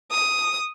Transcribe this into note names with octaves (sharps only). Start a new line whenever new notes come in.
D#6